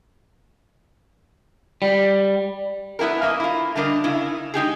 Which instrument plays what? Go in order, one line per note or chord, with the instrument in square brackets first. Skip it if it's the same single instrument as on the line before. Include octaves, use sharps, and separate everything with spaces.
[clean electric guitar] G3
[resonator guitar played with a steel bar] A3 B3 E4 G4 A#4
F#2 A#3 D#5
E4 F4
D3 G3 D4 A#4 D#5
C#3 D#4 E4
G#3 D#4 G4 G#4